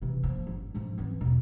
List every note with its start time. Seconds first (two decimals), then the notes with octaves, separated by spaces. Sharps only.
0.02 C3 E3
0.23 F3 A#3
0.47 G1
0.74 G#2 F3
0.98 E3 C4
1.21 E2 B2